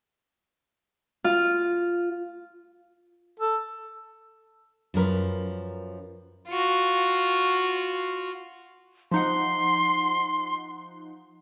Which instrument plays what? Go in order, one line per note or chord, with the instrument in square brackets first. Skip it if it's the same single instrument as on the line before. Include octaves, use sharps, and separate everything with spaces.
[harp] F4
[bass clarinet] A4
[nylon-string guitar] F#2 F3 A#4 B4
[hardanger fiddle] F4 F#4
[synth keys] F3 D#4 F#5 [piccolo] C6